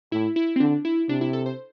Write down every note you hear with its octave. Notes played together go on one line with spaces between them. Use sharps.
A2 E4
E4
C4
D3 D4
E4
C3 D4
E4
A4
C5